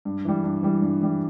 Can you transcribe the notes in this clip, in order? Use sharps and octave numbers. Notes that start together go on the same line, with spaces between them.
G2
E3 G3
G2
E3 G3
G2
E3 G3